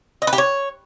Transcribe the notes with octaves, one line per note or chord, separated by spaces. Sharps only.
D#5
B4
G4
C#5